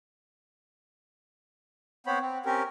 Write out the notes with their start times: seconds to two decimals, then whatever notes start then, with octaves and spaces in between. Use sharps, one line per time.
2.07 B3 C4 C5 C#5 B5
2.21 C4
2.46 C4 C#4 G4 A#4